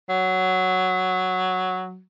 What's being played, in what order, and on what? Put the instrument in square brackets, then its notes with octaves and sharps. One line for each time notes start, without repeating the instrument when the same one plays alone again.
[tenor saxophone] F#3